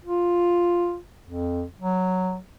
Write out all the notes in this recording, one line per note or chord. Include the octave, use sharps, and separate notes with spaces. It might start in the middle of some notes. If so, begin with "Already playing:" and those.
F4
F2
F#3